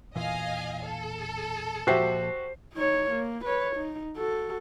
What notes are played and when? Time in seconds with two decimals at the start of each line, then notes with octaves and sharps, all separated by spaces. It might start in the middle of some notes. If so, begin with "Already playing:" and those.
0.16 E1 A#2 E3 D#5 F5 G#5
0.85 A4
1.87 A#2 F3 F#4 G4 C5 E5 C7
2.74 D#4 C#5
3.11 A#3
3.45 B4 C#5
3.76 D#4
4.17 F#4 A4